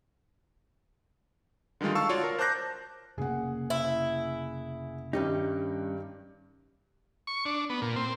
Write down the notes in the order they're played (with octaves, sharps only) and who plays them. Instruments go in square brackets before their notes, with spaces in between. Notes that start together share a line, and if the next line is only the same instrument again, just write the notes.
[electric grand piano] D3 D#3 G3 G#3 F4
F5 A5 C#6 E6
F4 F#4 C#5 D5
A#4
C5 A5 D6 F#6 G6 A#6
[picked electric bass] F1 C#3 A#3 [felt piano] G#4 F#5
[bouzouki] E4
[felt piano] G2 D#3 G4 [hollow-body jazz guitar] G3 C#4 D#4
[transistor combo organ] C#6
D4
B3
A#2
C4